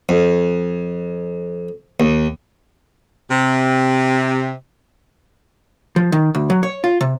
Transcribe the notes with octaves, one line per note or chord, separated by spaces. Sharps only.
F2
D#2
C3
F3
D#3
D2
F#3
C#5
F4
C3